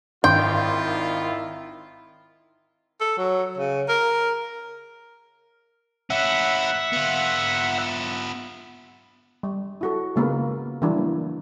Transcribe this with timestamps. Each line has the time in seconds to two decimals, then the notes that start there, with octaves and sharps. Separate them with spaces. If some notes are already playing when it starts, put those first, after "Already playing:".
0.24 G#1 D#3 E4 F4 G5 C6
3.01 A4
3.18 F#3
3.58 C#3
3.89 A#4
6.10 C#4 E4 E5 F#5
6.93 B3 F4
9.43 G3
9.81 E4 F#4 A4
10.16 C#3 G#3 A#3 B3 A#4 B4
10.82 E3 F#3 G3 D4
10.97 A#3